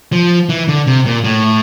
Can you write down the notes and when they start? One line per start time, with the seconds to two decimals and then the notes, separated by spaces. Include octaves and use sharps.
0.12 F3
0.49 E3
0.68 D3
0.87 C3
1.06 A#2
1.24 A2